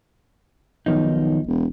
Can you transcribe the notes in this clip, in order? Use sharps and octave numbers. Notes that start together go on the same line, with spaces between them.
B1 D#3 F3 D#4
E1